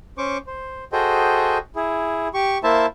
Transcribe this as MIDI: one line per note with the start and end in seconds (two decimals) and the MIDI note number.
0.18 0.38 61
0.18 0.38 72
0.18 0.38 85
0.18 0.38 86
0.47 0.84 72
0.93 1.58 66
0.93 1.58 68
0.93 1.58 69
0.93 1.58 72
0.93 1.58 75
0.93 1.58 79
1.76 2.28 64
1.76 2.28 68
2.34 2.58 67
2.34 2.58 85
2.64 2.86 58
2.64 2.86 64
2.64 2.86 72
2.64 2.86 76
2.64 2.86 81